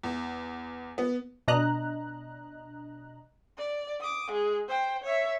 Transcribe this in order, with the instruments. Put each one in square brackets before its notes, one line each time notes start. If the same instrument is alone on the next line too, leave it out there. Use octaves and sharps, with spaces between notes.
[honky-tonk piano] E2
B3
[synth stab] B2 D4 D#5 A#5 F#6
[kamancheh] D5
D6 D#6
G#3 G#4
C5 G5
C#5 E5